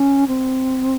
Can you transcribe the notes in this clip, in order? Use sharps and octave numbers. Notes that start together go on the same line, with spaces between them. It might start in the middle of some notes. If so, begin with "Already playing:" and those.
Already playing: C#4
C4